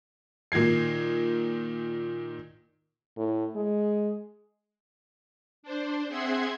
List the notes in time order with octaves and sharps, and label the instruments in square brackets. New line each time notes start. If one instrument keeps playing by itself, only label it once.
[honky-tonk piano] A#2 D#3 D#4 G#6 C7
[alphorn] A2
G#3
[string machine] D4 C5
C4 G#4 E5 F#5 C6 G#6